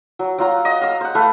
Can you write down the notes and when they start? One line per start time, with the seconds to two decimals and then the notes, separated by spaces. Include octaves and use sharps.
0.19 F#3
0.38 F#3 F4 A#5
0.65 D#5
0.81 F5 E6
1.01 C5 F#5
1.15 A3 B4 F5